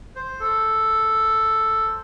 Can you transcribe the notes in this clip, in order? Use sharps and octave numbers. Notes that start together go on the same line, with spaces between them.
C5
A4
C5